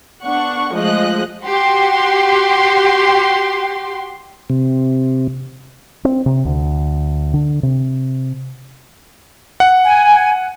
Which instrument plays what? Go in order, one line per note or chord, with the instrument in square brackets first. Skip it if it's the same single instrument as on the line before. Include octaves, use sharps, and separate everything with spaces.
[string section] B3 D4 F#5 C#6
F3 G#3 A3 D#5 F#6
[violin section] F#4 G4 C6
[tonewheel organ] C3
[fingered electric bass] C4
C3
D2
D3
C3
[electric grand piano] F#5
[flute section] G#5